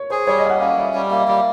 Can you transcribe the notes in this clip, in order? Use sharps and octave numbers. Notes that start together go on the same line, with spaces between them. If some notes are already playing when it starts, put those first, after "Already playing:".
Already playing: C#5
G#4 C5
G3 C#5
D#5
A#3 F5
F#5
C#4 F5
G3 E5
G3
A#3 E5
D#5
G3 E5